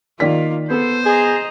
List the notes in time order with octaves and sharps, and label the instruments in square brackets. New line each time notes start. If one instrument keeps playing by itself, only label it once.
[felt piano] D#3 D5 B6 [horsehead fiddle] A#3 F4
[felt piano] B3 [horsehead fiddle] A4 [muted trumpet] C5
[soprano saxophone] G#4 [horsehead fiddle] D#5 A#5